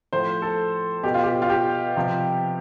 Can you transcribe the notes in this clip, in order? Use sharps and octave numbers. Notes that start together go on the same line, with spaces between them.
A2 F3 C5
A4
B2 G4
F4
G4
F4
G4
C3 F3